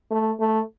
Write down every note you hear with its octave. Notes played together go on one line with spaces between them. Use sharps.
A3
A3